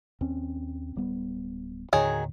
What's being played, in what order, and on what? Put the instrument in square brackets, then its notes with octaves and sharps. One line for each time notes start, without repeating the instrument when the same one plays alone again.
[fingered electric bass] D#2 C4 C#4
D1 G3 B3
[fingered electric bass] D#2 A2 D3 [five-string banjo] D#3 F#3 G#4